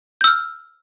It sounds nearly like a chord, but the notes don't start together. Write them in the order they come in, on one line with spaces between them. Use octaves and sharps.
G6 E6 F6